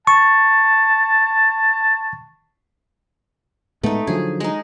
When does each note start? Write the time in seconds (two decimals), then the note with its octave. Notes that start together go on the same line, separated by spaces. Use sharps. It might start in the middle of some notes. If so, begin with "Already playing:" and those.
0.07 A5 C#6
3.83 A2 G#3 A3 B3 D#4
4.07 D3 F3 F#3 G#4
4.40 G#3 D#4